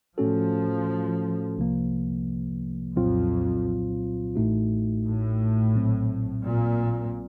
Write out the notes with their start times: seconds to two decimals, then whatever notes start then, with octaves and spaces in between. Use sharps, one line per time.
0.18 A2 F3 A3 C#4 F#4 A4
1.57 C2 C3 F3 A#3
2.96 C2 F2 A#2 F#3 C4 F4
4.35 A1 A2 A3 D#4 F#4
5.05 A2
5.75 A#1 A#2 F#3 C4
6.44 A#2